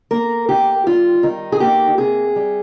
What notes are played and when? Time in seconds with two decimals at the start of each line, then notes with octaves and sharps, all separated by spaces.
0.11 A#3 A#4
0.49 D#3 G4
0.86 G3 F4
1.23 D#3 D#4
1.52 G#4
1.60 A#3 G4
1.97 C3 G#4
2.36 G3